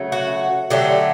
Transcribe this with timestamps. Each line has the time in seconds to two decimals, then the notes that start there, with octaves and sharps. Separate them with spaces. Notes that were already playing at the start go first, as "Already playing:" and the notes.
Already playing: C#3 F#3 A3
0.12 F#4
0.70 D3 F#3 A3 G4